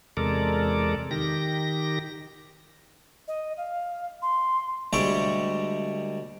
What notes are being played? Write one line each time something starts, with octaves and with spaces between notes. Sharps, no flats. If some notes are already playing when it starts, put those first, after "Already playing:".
E2 C3 G#3 A4 A#4 D5
D#3 G4 A#6
D#5
F5
C6
D2 G3 G#3 E5 G5 C#6